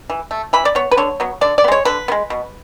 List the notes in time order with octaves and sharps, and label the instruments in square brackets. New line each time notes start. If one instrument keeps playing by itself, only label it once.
[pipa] E3
A3
E3 B5
D5
B3 C#5
B4
D3 C#5
F#3 B3
D3 D5
D5
B3
G#3 C#5
D3 B4
B3
G#3
B2